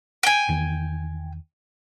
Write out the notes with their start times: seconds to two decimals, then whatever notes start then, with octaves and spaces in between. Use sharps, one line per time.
0.23 G5 G#5
0.49 E2 D#3